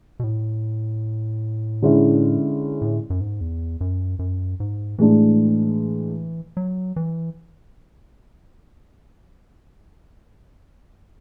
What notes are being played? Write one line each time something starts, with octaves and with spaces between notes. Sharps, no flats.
B2
A2
D3 G#3 C#4 E4
A2
F#2
G#2
E2
F#2
F#2
G#2
A2 E3 G#3 D4
F#3
E3